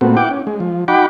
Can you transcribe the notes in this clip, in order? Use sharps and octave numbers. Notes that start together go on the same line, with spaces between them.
A#2 A3 B3 C4 F#4
E4 F#5 G5 D6
C#4
G#3
F3
D#4 F#4 F#5 G5 B5 D6